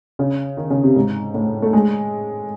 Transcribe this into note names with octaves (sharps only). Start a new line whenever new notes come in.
C#3
D#3
C#3
C3
G#2
A2
A3
G#3